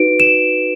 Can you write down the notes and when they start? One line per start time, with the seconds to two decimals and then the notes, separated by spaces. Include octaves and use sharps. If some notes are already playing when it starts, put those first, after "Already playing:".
Already playing: D#4 F#4 B4 D7
0.20 E7